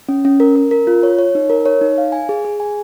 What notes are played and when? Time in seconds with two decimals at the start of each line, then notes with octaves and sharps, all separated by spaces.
0.09 C#4
0.25 C#4
0.40 A#4
0.56 A#4
0.71 A#4
0.87 F4
1.03 C#5
1.19 C#5
1.35 D#4
1.50 A#4
1.66 C#5
1.81 D#4
1.98 F5
2.12 G#5
2.29 G#4
2.45 G#4
2.60 G#5